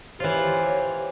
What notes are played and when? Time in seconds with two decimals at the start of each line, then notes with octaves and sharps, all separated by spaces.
0.20 E3 F4 G4 C5 C#5